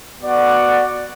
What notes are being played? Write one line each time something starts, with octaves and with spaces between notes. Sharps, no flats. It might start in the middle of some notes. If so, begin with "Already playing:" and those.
B3 F#4 D5 F#5